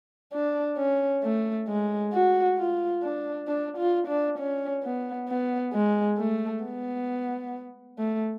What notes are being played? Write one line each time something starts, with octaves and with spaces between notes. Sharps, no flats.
D4
C#4
A3
G#3
F#4
F4
D4
D4
F4
D4
C#4
B3
B3
G#3
A3
B3
A3